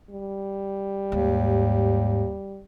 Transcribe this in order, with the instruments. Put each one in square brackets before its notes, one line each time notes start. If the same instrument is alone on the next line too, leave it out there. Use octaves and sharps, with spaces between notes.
[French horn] G3
[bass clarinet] D#2 [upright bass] G#2